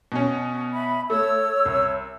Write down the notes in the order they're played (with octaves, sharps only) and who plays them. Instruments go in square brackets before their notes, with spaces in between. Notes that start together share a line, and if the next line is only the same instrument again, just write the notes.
[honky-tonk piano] B2 C#4
[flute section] E5 B5
[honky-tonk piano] A3 [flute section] C#5 E6
[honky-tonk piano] C2